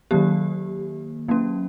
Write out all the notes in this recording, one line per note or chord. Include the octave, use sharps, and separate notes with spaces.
D#3 F#3 A#3 G4
F#3 A#3 C#4